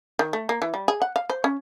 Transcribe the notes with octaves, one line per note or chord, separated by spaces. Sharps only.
D#3
A3
A#3
E3
G3
G#4
F#5
F5
C5
C#4